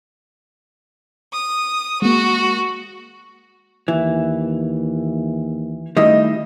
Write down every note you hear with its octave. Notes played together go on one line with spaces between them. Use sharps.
D#6
G#3 A#3 F#4
D#2 E3
D#3 G3 A3 E4 D#5